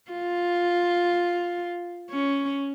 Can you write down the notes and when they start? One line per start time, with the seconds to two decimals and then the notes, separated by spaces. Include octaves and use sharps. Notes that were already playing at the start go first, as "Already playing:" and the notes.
0.11 F4
2.10 C#4